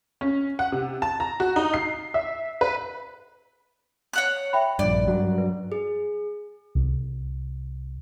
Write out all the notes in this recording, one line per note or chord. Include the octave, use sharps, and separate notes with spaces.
C#4
F#5
C3
A5
A#5
F#4
D#4
C7
E5
B4
C#5 F#5 F#6
E5 G5 B5
A#1 G2 D5
G2 F#3
B4
G#4
C2